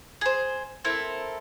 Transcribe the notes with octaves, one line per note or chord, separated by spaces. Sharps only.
G#4 C5
C4 E4 A4 A#4